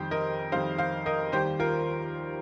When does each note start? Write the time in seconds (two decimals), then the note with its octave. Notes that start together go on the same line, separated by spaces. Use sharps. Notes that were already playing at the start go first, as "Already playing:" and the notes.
Already playing: F2 D#3 G3 G4 C5
0.11 A#4 D#5
0.52 F2 D#3 G3 C5 F5
0.78 C5 F5
1.06 A#4 D#5
1.32 D#2 D#3 G3 G4 C5
1.59 F4 A#4